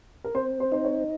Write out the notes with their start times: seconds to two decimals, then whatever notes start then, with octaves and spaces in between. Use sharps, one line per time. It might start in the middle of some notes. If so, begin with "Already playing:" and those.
0.24 A#4
0.35 C4 C5
0.60 C5
0.72 D#4 C5
0.84 C#5